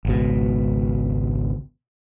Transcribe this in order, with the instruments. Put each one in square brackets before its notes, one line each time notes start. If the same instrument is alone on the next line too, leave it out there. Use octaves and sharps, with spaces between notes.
[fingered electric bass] G#1 C#2 B2